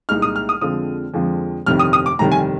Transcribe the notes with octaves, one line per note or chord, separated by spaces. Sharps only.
C2 A#2 G#3 D#4 F6
D#6
F6
D#6
F2 D3 F3 G#3 C4 D#6
F2 D3 F3 G#3 C4
G1 F2 C3 D#3 G3 F6
D#6
D#6
D6
G1 F2 C3 D#3 G3 A#5
G#5